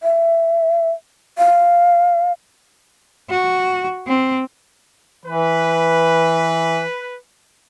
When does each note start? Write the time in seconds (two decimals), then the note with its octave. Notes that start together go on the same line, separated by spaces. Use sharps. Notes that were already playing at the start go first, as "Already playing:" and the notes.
0.03 E5
1.38 F5
3.30 F#4
4.07 C4
5.26 E3 B4